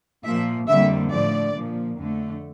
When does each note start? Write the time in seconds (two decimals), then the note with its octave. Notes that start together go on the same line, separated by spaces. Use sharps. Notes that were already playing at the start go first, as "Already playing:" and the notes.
0.24 A#2 F3 A#3 E5
0.68 F2 D3 G3 A#3 E5
1.11 A2 F3 A3 D5
1.54 A#2 F3 A#3
1.98 F2 D3 A3